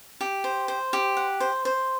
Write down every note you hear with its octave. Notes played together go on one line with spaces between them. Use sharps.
G4
C5
C5
G4
F#5
C5
C5